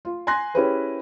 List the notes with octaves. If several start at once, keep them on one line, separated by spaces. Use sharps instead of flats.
F4
G#5 C6 F#6 A#6
C#4 E4 G4 G#4 B4 C5